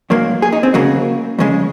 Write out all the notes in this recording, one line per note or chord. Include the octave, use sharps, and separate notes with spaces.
G#2 F#3 A#3
G#4
D#4
C4
C#2 C#3 F#3 A#3
F2 C#3 G#3